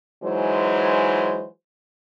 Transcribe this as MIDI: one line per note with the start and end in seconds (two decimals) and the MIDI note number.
0.24 1.46 52
0.24 1.46 54
0.24 1.46 56
0.24 1.46 63
0.24 1.46 72